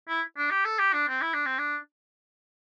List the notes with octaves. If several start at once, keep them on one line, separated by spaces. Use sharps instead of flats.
E4
D4
G4
A4
G4
D4
C4
E4
D4
C4
D4